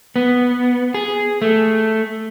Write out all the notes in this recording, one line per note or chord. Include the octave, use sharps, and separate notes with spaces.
B3
G#4
A3